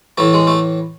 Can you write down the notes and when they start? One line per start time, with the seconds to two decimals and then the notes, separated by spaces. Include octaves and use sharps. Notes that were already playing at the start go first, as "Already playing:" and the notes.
0.18 A2 E3 A3
0.34 G#3
0.47 A3